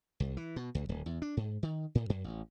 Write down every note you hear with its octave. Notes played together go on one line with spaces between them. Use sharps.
C2
E3
B2
C#2
D1
E2
D4
G#2
D#3
A2
F#2
A1